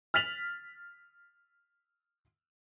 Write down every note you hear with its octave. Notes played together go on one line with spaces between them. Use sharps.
F6 A6 B6 F7 F#7